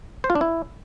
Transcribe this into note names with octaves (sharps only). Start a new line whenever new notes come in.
C5
F4
D4
E4